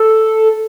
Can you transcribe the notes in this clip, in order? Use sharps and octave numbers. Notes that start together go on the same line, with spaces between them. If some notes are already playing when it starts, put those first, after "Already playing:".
Already playing: A4